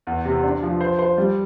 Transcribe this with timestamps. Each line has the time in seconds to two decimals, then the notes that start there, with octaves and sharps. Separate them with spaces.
0.07 E2
0.25 C3
0.44 D4
0.62 F3
0.81 C5
0.99 C5
1.18 G3